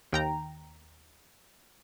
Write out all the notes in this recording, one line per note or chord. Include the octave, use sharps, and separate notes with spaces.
D#2 G5 A#5